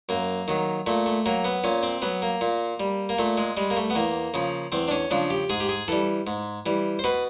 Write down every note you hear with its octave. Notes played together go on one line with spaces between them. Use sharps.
F#2 A#3
D#3 F#3
A#2 A3
A3
F#3 A#3
B3
A#2 C#4
C4
F#3 B3
A#3
A#2
G3
A#3
A#2 A3
G#3
G3 G#3
A#3
A3
B3
E2 A#3
C#3 F3
E2 C4
D4
C#4
C#3 F3 D4
G4
G#2 G#4
G4
G#4
E3 G3 A4
G#2
E3 G3
C5
B2 B4